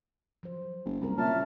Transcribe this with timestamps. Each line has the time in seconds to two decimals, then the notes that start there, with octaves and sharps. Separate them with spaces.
0.43 F3 F#3 C5
0.85 F#1
1.01 C2 G3 A#3 A#4
1.18 A#2 C#3 C#4 C#5 E5 A5 F6